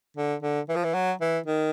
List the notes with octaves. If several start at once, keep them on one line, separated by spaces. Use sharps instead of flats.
D3
D3
E3
F3
E3
F#3
E3
D#3